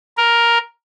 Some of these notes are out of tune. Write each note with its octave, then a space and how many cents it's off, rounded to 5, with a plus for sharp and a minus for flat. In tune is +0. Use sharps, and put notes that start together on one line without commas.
A#4 +5